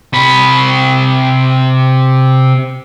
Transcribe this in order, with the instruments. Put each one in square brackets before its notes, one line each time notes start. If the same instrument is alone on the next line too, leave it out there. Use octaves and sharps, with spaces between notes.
[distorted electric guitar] C3 B5